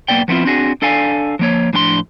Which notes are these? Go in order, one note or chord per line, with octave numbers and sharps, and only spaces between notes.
B1 D#3 A#3 B3 D5 G5
F3 B3 C4 E4 F4
C4 D4 F#4 G#4
D4 A4 D5 F5 G#5
F3 A#3 C#5
A2 F3 D4 G#5 C6